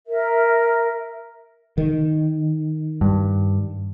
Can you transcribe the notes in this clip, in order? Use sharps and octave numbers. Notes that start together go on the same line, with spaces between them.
A#4 E5
D#3
G2